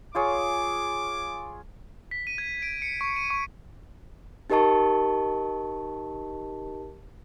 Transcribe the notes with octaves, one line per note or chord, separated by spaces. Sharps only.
F4 G#4 C#5 D6
B6
D#7
G#6
D7
C#7
C#6
D#7
C#6
D#4 G4 A#4 D#5 A5 C#6